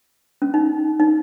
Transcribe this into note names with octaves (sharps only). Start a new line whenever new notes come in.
C#4
D#4
D#4